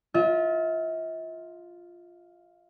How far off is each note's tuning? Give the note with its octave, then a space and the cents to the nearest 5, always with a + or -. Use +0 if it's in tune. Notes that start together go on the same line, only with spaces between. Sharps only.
F4 +0 E5 -45